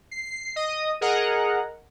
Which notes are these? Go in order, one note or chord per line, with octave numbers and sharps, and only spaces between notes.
C7
D#5 D#6
G#4 A#4 D#5 F#5 A#5